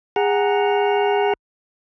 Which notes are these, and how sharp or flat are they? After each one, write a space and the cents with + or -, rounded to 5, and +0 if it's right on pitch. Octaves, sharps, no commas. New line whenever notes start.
G#4 -25 F#5 +0 A#5 +0